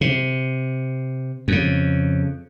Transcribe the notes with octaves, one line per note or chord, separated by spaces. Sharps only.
C3
F2 C#3